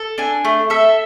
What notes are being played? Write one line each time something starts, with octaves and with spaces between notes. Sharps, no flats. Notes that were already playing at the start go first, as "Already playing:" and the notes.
Already playing: A4
D4 G#5
A3
A4 E5